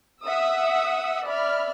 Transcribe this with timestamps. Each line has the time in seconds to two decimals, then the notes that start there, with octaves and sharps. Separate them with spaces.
0.23 E5 F#5 D#6 E6
1.27 D5 E5 B5 F6